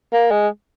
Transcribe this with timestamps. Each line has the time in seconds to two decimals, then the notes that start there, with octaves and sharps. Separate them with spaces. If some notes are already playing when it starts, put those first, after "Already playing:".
0.13 A#3
0.31 G#3